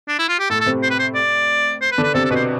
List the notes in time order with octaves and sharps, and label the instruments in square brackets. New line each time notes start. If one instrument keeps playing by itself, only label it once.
[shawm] D4
E4
F4
G4
[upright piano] A2 A3 [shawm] A4
[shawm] A4
[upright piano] C3 C4
[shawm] C5
B4
C5
D5
C5
B4
[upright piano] D3 D4
[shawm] B4
[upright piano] C3 C4 [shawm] A4
[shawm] A4
[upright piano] B2 B3 [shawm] B4
[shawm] C5